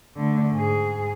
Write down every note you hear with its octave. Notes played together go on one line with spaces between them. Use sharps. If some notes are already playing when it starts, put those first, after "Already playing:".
D3 A3
G#2 G#4